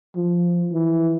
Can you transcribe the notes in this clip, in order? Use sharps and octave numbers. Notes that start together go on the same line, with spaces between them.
F3
E3